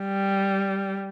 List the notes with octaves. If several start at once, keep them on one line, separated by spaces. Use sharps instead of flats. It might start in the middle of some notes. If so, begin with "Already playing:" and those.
Already playing: G3